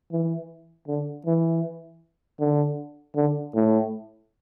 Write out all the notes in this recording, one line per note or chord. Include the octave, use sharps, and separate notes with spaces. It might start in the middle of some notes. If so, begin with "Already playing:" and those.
E3
D3
E3
D3
D3
A2